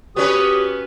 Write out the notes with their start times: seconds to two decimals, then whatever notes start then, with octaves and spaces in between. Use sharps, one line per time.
0.16 B3 C#4 F#4 G4 B4 D#6